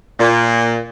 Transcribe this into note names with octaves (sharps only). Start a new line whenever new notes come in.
A#2